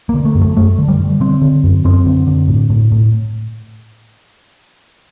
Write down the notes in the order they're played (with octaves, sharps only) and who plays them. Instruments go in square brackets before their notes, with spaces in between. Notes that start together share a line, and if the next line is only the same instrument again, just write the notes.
[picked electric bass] D3 A#3
A3
F#2
A3
F#2 A3
D3
G3
D3
D3 C4
D3
F#2
F#2 C4
D3
D3
A2
A2
A2